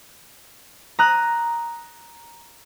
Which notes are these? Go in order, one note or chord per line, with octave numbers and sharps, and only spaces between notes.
A#5 D#6 F#6